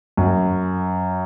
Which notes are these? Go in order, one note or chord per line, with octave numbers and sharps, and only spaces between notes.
F#2